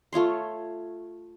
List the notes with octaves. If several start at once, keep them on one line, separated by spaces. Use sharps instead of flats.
A3 F4 C#5 C6